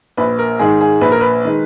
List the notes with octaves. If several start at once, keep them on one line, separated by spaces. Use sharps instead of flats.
A#1 B4
A#4
G#2 D#3 G#3 G#4
G#4
A#1 B4
A#4
B4
D#3 G#3